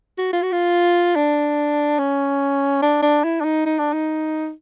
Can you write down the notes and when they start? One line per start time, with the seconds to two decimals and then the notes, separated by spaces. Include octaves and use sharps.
0.18 F#4
0.33 F4
0.42 F#4
0.52 F4
1.16 D4
1.99 C#4
2.82 D4
3.02 D4
3.24 E4
3.40 D4
3.44 D#4
3.66 D#4
3.79 D4
3.93 D#4